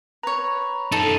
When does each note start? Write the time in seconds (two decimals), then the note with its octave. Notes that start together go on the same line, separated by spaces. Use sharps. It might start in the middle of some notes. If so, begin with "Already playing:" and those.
0.23 B4 C#5 A#5
0.92 F#2 D#4 A4